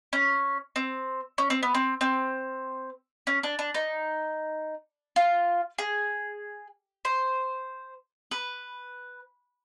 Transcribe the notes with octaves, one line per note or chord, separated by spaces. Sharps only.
C#4
C4
C#4
C4
B3
C4
C4
C#4
D4
D4
D#4
F4
G#4
C5
B4